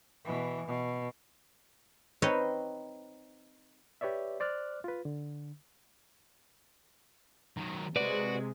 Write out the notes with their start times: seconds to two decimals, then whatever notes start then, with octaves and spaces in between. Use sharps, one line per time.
0.24 B2 E3
0.67 B2
2.22 C4 D#4 B4 C#5 D#5
4.01 G4 B4 C#5 D5 E5
4.40 C5 D5 D6 F6 F#6
4.84 F4 B4
5.05 D3
7.57 D#3 F#3
7.96 C3 G#3 F#4 B4 D5